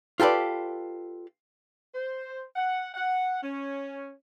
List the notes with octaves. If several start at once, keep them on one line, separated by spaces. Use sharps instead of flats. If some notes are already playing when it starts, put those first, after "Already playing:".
F4 G4 A4 B4 D5
C5
F#5
F#5
C#4